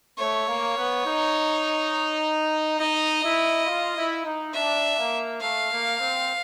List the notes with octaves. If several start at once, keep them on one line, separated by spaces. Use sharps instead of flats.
A3 C#5
A#3
B3
D#4
D#4 D#5
E4
F4
E4
D#4
D4 E5
A#3
A3 F5
A#3
C4